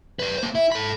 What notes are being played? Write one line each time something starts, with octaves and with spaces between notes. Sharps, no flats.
B4 D5
A#3 C5
E4
A4 B5